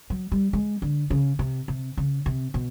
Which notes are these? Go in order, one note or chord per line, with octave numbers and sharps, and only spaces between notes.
F#3
G3
G#3
D3
C#3
C3
C3
C#3
C3
B2